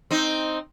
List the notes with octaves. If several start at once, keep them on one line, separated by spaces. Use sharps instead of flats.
C4 D#4